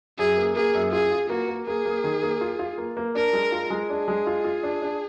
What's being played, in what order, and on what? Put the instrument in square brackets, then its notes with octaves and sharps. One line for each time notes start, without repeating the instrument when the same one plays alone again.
[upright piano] F#2 [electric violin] G#4
[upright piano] A#3
[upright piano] A#3 [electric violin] G#4
[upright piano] F#2
[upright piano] F4 [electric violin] G#4
[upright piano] F4
[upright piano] A#3 [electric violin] F#4
[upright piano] A#3
[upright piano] A#3 [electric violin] G#4
[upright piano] A#3
D#3
A#3
F4
F4
A#3
A#3
[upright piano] D4 [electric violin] A#4
[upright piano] G#3
F4
G#3
[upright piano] D4 [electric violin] G#4
[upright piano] G#3
F4
F4
D4
D4